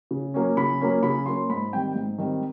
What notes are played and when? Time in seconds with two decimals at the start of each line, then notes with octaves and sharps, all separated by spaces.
0.11 C#3
0.34 F#3 A#3 C#4
0.57 C#3 B5
0.81 F#3 A#3 C#4
1.03 C#3 B5
1.26 F#3 A#3 C#4 C6
1.50 G#2 B5
1.73 D#3 G3 C4 G5
1.95 G#2
2.18 D#3 G3 C4